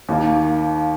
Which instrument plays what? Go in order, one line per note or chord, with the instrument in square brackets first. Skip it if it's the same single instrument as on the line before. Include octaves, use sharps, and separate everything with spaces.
[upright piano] D#2 D#3 A#3